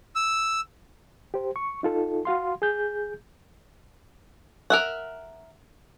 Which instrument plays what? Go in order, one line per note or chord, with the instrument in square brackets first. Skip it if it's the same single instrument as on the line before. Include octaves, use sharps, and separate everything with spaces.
[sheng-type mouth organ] E6
[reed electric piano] G4 C5
C#6
D#4 F4 A4
F#4 F5 C6
G#4 G6
[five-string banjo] A#4 E5 F#5